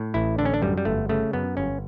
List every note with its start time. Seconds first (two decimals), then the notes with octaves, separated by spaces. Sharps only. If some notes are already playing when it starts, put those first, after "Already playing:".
Already playing: A2
0.14 A1 E4
0.38 D3 D4
0.45 C#4
0.54 D4
0.62 F#2 G3
0.78 G3
0.85 G1 A3
1.09 C#3 A3
1.33 F#2 B3
1.57 G1 C#4